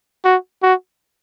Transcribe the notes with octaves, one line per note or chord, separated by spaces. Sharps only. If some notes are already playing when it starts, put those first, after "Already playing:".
F#4
F#4